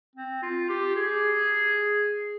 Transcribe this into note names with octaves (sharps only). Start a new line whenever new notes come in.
C4
F4
G4
G#4